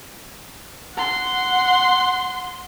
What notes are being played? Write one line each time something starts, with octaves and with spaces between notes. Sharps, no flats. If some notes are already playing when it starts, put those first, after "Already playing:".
F#5 C6